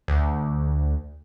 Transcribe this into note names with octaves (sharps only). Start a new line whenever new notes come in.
D2